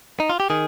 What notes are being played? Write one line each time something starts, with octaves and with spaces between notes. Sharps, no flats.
D#4
F4
G4
D#3 G#4